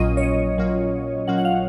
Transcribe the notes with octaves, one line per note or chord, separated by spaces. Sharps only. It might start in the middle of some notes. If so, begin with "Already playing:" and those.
Already playing: A#1 A#2 F#3 C#4 F4 D#5
C#5
D#5
A#1 A#2 F#3 C#4 F4
A#1 A#2 F#3 C#4 F4 F#5
F#5
F5